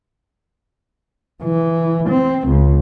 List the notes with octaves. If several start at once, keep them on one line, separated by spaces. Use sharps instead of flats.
E3
C4
C#2